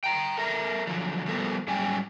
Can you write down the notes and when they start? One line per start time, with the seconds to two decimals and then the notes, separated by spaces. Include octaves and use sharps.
0.04 G5 A#5
0.38 A4 A#4 E5 A#5
0.87 D3 F3 F#3
1.26 F3 G3 B3 A4 A#4 C5
1.68 G#2 F#3 G3 C#4 G5 G#5